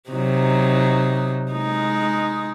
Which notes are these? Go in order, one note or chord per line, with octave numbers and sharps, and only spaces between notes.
C3 F#3 D#4
G#3 D#4